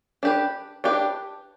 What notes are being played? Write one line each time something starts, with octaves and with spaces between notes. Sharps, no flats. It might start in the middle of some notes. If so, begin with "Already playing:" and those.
D4 G4 B4
D4 G4 B4